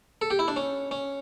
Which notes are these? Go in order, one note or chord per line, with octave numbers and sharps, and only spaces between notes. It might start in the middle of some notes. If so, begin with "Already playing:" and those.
A4
G4
E4
D4
C#4
C#4